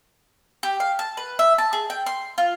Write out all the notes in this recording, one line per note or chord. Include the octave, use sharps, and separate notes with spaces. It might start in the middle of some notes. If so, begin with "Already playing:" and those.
G4
F5
A5
B4
E5
A5
G#4
G5
C6
F4